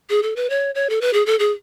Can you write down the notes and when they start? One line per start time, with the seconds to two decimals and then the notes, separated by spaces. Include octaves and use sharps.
0.10 G#4
0.23 A4
0.36 B4
0.50 C#5
0.75 C#5
0.90 A4
1.01 B4
1.13 G#4
1.26 A4
1.39 G#4